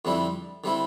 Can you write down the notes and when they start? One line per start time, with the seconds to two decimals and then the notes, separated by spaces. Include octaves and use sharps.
0.05 F2 D3 G3 C4 E4
0.64 D3 G3 C4 E4